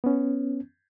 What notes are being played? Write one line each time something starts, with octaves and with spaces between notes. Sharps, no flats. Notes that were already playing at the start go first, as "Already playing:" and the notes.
B3 C#4